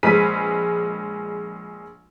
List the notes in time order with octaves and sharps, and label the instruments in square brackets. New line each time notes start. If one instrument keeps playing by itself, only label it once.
[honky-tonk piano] A#1 G#3 G#4 B4 B6 D#7